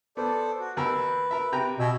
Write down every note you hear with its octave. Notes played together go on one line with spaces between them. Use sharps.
B3 A4 C5 D5
F#4
D#2 A#4 B4 E6
A#4 E5
C3 G5 A#5
B2 G#5 E6